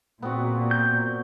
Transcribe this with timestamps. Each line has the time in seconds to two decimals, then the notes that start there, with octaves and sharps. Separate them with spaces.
0.22 A#2 B3 C4 F#4
0.71 G6